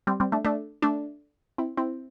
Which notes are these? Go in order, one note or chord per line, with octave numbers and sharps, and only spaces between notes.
G3 C4
G3 C4
A3 D4
A3 D4
A3 D4
C4 E4
C4 E4